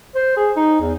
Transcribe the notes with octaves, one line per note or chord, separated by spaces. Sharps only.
C5
G#4
D#4
E2